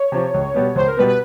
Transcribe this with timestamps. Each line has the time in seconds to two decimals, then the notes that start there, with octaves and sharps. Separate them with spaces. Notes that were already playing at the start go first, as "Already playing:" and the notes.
Already playing: C#5
0.12 C3 F3
0.34 C#2
0.54 B2 G3 B3
0.75 C#2 C5
0.86 A#4
0.97 B2 G3 B3 B4
1.08 B4